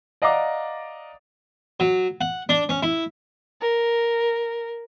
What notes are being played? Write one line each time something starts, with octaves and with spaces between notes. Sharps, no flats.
D5 D#5 F5 F#5 A#5 D6
F#3
F#5
D4
C#4
E4
A#4